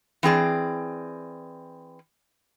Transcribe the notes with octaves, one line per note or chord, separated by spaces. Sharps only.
E3 C4 G#4 D5